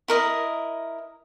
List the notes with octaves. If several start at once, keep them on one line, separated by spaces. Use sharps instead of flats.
E4 A#4 D#5